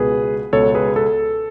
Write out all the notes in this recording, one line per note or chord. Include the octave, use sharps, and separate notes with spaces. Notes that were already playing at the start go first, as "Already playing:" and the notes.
Already playing: C#2 B2 G#4 B4
C#2 B2 A4 C#5
G#4 B4
A4